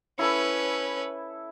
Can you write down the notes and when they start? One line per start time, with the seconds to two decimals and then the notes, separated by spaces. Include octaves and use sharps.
0.19 C#4 E4 A4 B4 B5